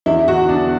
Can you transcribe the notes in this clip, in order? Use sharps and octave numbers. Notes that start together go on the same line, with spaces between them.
E2 E4
F#4
B2 D4